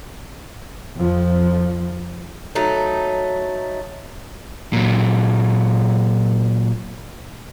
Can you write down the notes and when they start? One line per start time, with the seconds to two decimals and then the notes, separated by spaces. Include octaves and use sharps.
0.96 F2 F3
2.55 F#3 A3 D#4
4.73 A#2 F#3